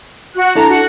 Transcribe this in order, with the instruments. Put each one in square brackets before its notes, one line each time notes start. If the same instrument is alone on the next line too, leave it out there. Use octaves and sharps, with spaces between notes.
[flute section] F#4 F#6
[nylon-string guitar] D4 E4 A4 [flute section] A#5
[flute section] F#4